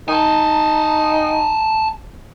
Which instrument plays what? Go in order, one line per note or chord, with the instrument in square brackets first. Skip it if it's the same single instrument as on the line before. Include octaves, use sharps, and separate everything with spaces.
[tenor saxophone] D#4 [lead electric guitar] G#5 A5